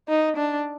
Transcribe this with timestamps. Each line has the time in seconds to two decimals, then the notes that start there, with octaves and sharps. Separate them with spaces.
0.09 D#4
0.37 D4